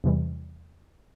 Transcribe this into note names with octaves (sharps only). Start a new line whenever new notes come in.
E2 C3 E3 G3